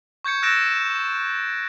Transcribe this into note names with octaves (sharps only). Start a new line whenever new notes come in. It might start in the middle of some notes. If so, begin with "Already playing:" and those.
C#6 G6 G#6 C#7
E6 F#6 A6 A#6 D7 E7